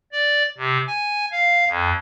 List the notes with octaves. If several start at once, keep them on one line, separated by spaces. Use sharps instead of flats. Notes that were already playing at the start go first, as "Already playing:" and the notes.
D5
C3
G#5
F5
F2